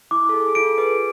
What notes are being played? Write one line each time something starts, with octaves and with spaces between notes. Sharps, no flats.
E4 D6
A4
G#4
G#4
F4 A4 D7
G#4 B4